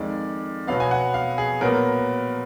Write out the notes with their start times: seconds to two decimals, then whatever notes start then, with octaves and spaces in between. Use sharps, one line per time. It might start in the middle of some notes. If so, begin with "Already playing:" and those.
Already playing: F2 D#3 G#3 D5
0.67 B2 F#3 B3 F5
0.80 G#5
0.91 F#5
1.14 F5
1.38 G#4
1.61 A#2 F#3 B3 A#4